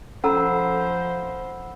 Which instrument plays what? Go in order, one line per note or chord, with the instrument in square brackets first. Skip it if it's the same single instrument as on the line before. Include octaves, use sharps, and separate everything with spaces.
[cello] F3 C5 [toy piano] C#4 A4 A#5 [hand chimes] F#5 B5 E6